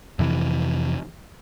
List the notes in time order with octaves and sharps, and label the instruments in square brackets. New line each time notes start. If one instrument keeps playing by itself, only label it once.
[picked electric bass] F2 C3 E3